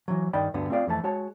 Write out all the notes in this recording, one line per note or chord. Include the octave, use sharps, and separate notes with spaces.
E3 F#3
G2 D#3 D5 G5 B5
D2 G2 D3 B3
A3 C4 F4 G#4 D5 F5
F2 E3 A3 A5
G#3 F#4 C#5 A5